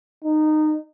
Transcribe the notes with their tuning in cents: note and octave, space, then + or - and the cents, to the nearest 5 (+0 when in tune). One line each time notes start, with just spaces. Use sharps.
D#4 -20